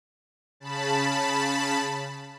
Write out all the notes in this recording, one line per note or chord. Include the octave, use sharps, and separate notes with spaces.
C#3 A5 B5